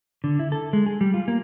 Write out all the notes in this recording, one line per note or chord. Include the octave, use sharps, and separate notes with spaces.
D3
E4
A4
G#3
G#4
G3
F4
A#3